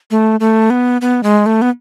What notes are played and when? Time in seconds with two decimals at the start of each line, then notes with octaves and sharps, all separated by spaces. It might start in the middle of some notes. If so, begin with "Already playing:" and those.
0.11 A3
0.40 A3
0.70 B3
1.01 B3
1.23 G#3
1.46 A3
1.62 B3